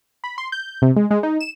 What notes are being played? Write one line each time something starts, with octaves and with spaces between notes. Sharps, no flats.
B5
C6
G6
C3
G#3
G#3
D#4
E7